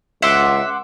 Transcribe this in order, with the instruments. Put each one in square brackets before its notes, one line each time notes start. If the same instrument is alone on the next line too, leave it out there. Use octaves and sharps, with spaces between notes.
[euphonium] C#2 [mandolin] E5 [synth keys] F#5 C6 D6